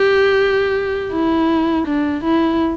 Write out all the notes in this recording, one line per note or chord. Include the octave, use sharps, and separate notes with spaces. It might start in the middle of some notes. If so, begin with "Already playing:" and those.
Already playing: G4
E4
D4
E4